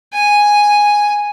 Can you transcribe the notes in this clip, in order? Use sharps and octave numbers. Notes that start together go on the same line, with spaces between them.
G#5